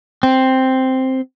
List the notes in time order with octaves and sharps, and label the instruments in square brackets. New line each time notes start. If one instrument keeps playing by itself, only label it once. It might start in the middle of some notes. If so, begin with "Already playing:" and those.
[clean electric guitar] C4